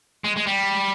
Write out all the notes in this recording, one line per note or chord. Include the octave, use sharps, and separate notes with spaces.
G#3
G#3
G3